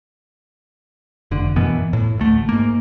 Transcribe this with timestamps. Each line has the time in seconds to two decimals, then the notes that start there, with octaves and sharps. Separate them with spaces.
1.31 F1 D3
1.56 F#2 B2 E3 B3
1.93 A2
2.18 A1 D2 A3
2.49 G#2 A#3